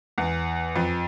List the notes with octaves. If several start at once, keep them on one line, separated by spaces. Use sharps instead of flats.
E2
F2